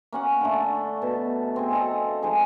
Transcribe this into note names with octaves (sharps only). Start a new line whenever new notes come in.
A#3 C#4 F#5
D3 A3
B2 A5
C4 G#4
A4 D#5 F5 A5
F3 G#3 D#4 G#4